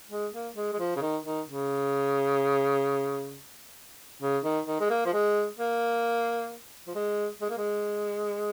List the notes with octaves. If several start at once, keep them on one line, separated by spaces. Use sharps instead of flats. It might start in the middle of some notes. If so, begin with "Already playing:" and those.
G#3
A#3
G#3
G#3
F3
C#3
D#3
D#3
C#3
C#3
D#3
D#3
G#3
A#3
F3
G#3
A#3
F3
G#3
G#3
A#3
G#3